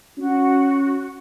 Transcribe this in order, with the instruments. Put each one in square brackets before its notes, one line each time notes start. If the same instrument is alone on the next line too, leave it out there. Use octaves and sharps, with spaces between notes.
[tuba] C#4 [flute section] F#4